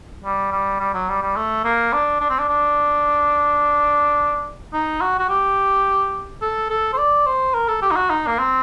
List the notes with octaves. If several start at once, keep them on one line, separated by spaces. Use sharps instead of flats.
G3
G3
G3
F#3
G3
G3
A3
A#3
D4
D4
C4
D4
D4
D#4
F#4
F#4
G4
A4
A4
C5
D5
C5
A#4
A4
G4
D#4
F#4
D#4
A#3
C4